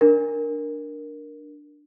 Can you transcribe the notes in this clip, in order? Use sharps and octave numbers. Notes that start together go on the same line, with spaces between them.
D4 A#4